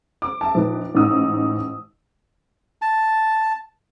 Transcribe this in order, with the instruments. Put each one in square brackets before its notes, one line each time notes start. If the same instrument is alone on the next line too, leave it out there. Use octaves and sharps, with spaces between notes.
[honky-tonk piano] D6
E5 A5
A#1 D#4 B4
A1 G#2 D#4 D#6 E6
[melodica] A5